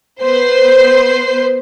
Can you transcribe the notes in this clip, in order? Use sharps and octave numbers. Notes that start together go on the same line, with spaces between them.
B3 B4 C5 C7